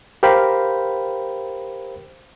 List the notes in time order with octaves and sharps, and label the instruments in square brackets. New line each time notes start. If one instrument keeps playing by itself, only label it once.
[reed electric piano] G4 A#4 C5 F5 G5 B5